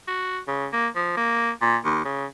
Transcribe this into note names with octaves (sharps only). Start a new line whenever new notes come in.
F#4
C#3
A#3
F3
A#3
A#2
D#2
C#3